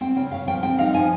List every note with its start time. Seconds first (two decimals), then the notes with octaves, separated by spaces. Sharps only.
0.01 C4 G5
0.16 C#3 G5
0.31 C#3 F5
0.48 F3 G5
0.63 C4 G5
0.78 D#4 F5
0.94 F3 G#5